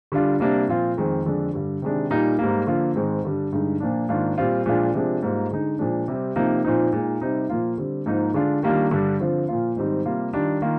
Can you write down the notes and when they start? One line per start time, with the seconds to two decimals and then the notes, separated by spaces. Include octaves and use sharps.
0.12 D3 G3 D4 F4
0.40 C3 G3 A#3 D4
0.68 A#2 F3 C4 F4
0.97 F2 D#3 G#3 C4
1.25 F2 D3 G#3 D4
1.54 G2 D3 G3
1.82 C3 D#3 G#3 D4
2.10 A#2 G3 A#3 D#4
2.39 G#2 G3 A#3
2.67 D3 F3 A#3 F4
2.95 G#2 D#3 G#3 C4
3.24 G2 D3 G3 D4
3.53 G2 D3 G#3 D#4
3.80 A#2 F3 A#3 D4
4.09 G#2 D#3 A#3 D4 F4
4.38 A#2 G3 C4 F4
4.66 A#2 F3 G#3 D4 F4
4.94 C3 F3 G#3 D4
5.23 G#2 G3 A#3 F4
5.51 D3 G#3 D#4
5.79 A#2 F3 G#3 D4
6.08 C3 G3 C4
6.36 C3 F3 A#3 D#4
6.64 A#2 F3 C4 D#4
6.93 A#2 G#3 D#4
7.21 C3 G3 C4 D#4
7.49 A#2 F3 A#3 F4
7.78 D3 G3 C4
8.06 G#2 F3 A#3 D#4
8.34 D3 G#3 D4 F4
8.63 D#3 G3 A#3 D4 F4
8.91 G2 D3 G3 D4
9.20 D3 F3 C4 F4
9.48 A#2 F3 A#3 F4
9.77 G#2 D#3 G3 C4 D#4
10.05 C3 G3 A#3 F4
10.33 D#3 G3 D4 F4
10.62 D#3 A#3 F4